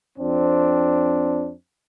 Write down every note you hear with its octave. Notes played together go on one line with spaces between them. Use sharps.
F2 C4 D4